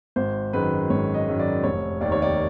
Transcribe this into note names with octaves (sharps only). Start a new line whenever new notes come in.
G#1 C5
F#2 D#3 G#3 B4
G#1 C#5
D#5
F#2 D#3 G#3
D5
F1 C#5
D#2 D#3 D5
C#5
D5